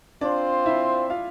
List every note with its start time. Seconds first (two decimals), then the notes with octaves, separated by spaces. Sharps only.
0.21 C4 D4 F4 C5 D5
0.66 E4 E5
1.10 F4 F5